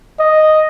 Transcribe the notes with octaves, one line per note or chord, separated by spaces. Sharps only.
D#5